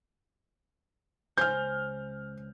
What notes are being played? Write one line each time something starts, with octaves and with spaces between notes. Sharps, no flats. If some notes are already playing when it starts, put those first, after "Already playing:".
C#2 C5 G#5 F6 G6